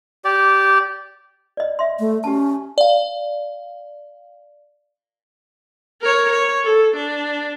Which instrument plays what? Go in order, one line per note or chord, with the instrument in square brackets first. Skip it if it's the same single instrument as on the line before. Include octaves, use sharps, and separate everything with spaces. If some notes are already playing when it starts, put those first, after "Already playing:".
[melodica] G4 D5
[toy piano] D5 D#5
E5 C6
[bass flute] A3
[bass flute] C#4 [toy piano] G4 A5
[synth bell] D5 F5
[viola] A#4 C#5
C#5
A4
D4